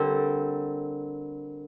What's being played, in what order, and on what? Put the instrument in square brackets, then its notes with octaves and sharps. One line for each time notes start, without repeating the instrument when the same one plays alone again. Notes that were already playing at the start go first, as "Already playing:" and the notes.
Already playing: [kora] D3 G3 C4 [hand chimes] A#4